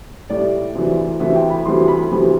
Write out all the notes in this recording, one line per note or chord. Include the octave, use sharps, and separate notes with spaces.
A2 G3 D5
D2 C3 E3
D2 C3 E3 E5
G5
B5
D2 C3 E3 G3 C6
C6
B5
D2 C3 E3 G3